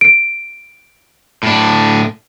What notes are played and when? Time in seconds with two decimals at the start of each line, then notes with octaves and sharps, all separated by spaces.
0.01 D7
1.43 A2 D4